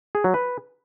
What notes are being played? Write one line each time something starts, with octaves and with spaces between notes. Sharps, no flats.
G#4
F#3
B4